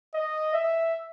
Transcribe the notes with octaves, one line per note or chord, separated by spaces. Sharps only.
D#5
E5